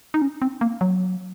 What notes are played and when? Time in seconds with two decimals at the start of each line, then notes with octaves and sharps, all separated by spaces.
0.14 D#4
0.22 C#4
0.42 C4
0.61 A#3
0.81 F#3